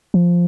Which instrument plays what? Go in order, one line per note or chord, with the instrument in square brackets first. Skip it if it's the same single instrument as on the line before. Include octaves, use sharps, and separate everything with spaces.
[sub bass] F3